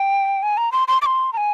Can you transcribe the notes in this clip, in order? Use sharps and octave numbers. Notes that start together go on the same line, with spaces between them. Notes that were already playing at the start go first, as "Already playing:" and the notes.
Already playing: G5
G#5
A#5
C6
C6
D6
C6
A#5
G#5